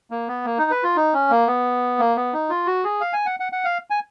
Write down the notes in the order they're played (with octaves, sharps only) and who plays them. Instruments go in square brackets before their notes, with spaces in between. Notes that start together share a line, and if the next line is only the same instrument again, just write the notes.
[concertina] A#3
B3
A#3
D#4
B4
F4
D#4
C#4
A#3
B3
A#3
B3
D#4
F4
F#4
G#4
F5
G#5
F#5
F#5
F#5
F5
G#5